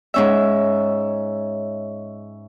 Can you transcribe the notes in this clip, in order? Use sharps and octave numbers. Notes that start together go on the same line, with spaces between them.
G#2 C#4 E5